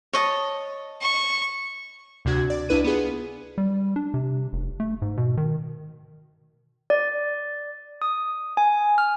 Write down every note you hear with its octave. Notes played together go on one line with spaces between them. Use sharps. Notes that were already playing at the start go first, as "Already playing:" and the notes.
C#5 D#5 A5
C#6
D2 C3 D4 F#4 G#6
D5
C#2 D4 E4 B4 D#7
B3 F4 G#4 B4
G3
D4
C3
F1
A3
G#2
B2
D#3
D5
D#6
G#5
F6